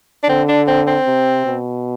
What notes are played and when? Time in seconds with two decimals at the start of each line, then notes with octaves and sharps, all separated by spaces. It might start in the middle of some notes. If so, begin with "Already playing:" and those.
0.23 D4
0.28 D3 C4
0.48 D4
0.67 C4
0.87 C4
1.07 C3
1.46 B2